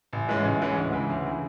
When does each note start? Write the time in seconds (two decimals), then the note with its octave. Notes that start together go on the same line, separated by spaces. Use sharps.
0.13 A1
0.28 G#2 E3 G#3 C#4
0.45 A1
0.61 G#2 E3 G#3 C#4
0.76 D2
0.93 C#3 E3
1.09 D2
1.25 C#3 E3